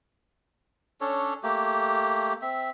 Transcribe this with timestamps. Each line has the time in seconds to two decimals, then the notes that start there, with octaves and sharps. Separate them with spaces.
1.01 C#4 D4 A4 C#5
1.43 A3 A#3 G4
2.42 C4 E5